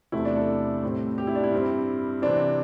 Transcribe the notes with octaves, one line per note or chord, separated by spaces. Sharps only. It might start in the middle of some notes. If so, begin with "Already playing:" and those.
E2 C3 A3 C4 E4
D4
A4
A2 G3 C4
G4
E4
D4
E4
G2 G3 C4
C3 E3 C4 D4